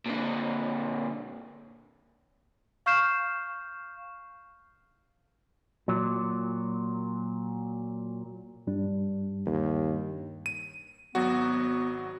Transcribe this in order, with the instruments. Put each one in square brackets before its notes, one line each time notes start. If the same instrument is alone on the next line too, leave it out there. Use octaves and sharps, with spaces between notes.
[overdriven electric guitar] A#2 D3
[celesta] F5 C#6 F6 G6 C7 E7
[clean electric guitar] A#2 F#3
[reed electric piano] G2 G3 D4
[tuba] D#2
[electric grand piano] D#7
[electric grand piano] G#1 F#3 F#4 [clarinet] B3